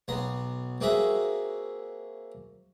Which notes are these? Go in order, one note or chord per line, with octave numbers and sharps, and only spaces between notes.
B1 B3 A#5 C6
A#3 C4 F#4 G#4 E5 A#5